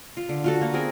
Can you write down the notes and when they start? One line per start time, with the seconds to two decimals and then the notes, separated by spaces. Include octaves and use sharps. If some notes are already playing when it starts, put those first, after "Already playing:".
0.17 F4
0.29 D3
0.44 F4 F#4 A4
0.61 A#3
0.74 B3 C4 G#4 A#4